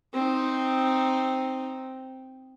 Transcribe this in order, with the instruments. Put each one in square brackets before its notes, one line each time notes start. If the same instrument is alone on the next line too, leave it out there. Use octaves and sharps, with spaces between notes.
[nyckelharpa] C4 D#4